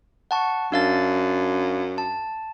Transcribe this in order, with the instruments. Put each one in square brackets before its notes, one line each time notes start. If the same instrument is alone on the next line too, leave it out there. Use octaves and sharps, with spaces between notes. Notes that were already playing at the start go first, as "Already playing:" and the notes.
[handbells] F#5 A5 C#6
[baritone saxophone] F#2 [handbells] D4 F5 A6
[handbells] A5